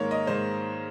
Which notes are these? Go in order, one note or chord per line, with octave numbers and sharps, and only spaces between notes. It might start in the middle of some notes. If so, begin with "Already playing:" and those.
Already playing: G#2 D#3 A#3 A#4 C#5
D#5
G#2 D#3 A#3 C5